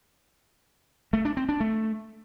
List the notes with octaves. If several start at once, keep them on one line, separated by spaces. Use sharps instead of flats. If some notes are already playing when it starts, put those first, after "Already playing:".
A3
D4
C4
D4
A3